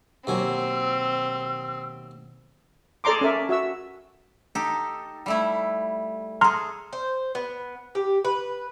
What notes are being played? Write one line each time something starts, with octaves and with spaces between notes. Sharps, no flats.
D#2 B2 D#3 F#3 C4 G#5 E6
G#4 A4 D5 A#5 C6 D6
C#4 A4 A#4 E5
F#4 E5 E6
D#4 G4 A4
G3 A3 E4
G#4 A4 A#5 C6 F6
C5
B3
G4
B4